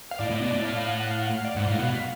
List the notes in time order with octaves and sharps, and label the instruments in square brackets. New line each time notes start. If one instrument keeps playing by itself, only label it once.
[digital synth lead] F5
[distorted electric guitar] A2 [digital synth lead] D5
[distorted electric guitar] A2
B2
A2
[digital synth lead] F5
F5
F#5
F#5
F5
F#5
F5
D5
[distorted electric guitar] G#2 [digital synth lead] F#5
[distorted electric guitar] A2 [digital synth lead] F5
[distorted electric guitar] B2 [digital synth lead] F#5
[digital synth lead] F5